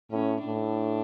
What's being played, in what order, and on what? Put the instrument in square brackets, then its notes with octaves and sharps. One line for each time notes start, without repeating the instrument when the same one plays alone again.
[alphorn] A2 [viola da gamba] C#4
[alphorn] A2 [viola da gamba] D4